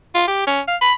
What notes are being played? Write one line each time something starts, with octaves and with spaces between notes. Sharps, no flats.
F4
G4
C#4
F5
B5